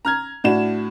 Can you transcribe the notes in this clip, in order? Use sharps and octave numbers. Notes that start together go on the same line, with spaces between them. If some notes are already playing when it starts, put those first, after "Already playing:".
A#5 F6 G#6
A2 D4 F#4 E7